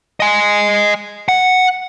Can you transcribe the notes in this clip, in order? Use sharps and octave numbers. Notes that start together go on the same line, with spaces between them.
D#5 G#5
F#5